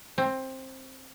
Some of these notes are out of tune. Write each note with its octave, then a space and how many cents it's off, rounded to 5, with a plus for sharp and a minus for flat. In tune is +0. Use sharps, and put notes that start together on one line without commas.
C4 +15